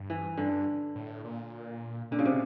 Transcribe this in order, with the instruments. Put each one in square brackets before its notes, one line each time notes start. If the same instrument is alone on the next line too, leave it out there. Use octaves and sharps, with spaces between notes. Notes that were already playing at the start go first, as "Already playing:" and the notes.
Already playing: [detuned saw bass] G2
[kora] E3
[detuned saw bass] G2 [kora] D3
[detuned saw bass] A2
A#2
[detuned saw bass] A#2 [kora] D3
[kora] C#3
C3